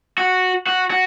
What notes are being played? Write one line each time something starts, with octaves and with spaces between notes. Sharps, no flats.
F#4
F#4
F#4